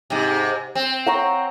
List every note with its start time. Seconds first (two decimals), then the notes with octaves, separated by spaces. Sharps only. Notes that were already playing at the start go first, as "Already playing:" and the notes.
0.10 G#2 C3
0.75 C4
1.07 F#5 A#5 C#6